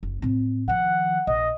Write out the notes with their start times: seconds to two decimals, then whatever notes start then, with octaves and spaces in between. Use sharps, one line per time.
0.03 F#1
0.22 A2 C4
0.68 D#3 F3 F#5
1.27 A#1 D#5